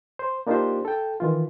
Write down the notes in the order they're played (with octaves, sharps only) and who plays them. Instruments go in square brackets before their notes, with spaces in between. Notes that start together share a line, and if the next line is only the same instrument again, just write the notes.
[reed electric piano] C5
A#3 D4 D#4 F4 G4 C5
A4 G5
D#3 E3 F4